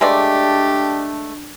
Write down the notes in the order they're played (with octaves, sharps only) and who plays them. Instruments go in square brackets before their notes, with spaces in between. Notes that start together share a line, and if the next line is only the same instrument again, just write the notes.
[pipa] G#3 A3 D5 [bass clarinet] D4 [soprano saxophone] G4